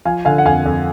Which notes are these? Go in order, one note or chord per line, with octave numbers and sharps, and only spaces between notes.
F3 F5 G#5
D3 F5 G#5
F#5
F2 F5 G#5
F2